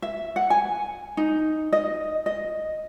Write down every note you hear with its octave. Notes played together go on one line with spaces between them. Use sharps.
E5
F#5
G#5
D#4
D#5
D#5